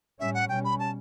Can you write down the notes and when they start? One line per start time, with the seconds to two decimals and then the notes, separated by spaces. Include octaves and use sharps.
0.19 A2 G3 C#4 E5
0.34 F#5
0.49 B2 G3 C#4 G5
0.64 B5
0.79 A5